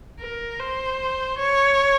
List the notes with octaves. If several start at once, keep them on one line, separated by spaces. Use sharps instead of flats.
A#4
C5
C#5